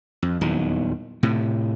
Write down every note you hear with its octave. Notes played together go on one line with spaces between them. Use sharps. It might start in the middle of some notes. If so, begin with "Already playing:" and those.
F2
D#1 E2 D#3 F#3
A2 C3